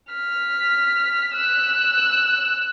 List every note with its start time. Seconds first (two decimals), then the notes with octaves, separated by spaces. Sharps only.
0.11 F6 B6
1.36 E6 F#6